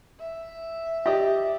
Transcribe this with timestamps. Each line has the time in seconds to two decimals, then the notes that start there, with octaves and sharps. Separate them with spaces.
0.20 E5
1.06 G4 D5 D#5